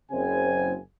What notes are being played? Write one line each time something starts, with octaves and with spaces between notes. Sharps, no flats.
F#1 C#3 C4 G#5